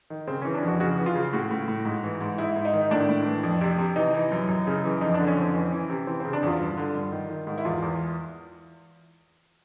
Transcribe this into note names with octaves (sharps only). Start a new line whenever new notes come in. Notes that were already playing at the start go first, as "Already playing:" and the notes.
D#3
C#3 C4
E3 C#4
D4
F2 F#4
C#3 F#4
E3
F4
C#3
A2 F#4
A2
A2
G#2
E3
G#2
G#2 E4
G#2
D#4
D#3
A2 D4
A2
E3
F2
C3
C3
E3 D#4
E3
F#2
F#2
C#3
E3
F2 D#4
D4
D3
C#4
F2 C4
E3 C#4
E3
C3
E3 C4
C#3 C4
D4
E2 F4
G2
D3
G2
D#3
D#3
G#2
E4
E2 F4
E2